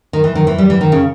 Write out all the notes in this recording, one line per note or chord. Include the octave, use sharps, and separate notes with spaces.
D#3
E3
D#3
E3
G3
E3
D#3
C#3